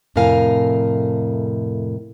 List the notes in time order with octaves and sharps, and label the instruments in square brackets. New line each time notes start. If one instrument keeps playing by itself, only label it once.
[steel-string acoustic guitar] F2 A2 C3 A#4 F5 G#5